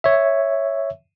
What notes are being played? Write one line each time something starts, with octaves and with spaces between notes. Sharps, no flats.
C#5 E5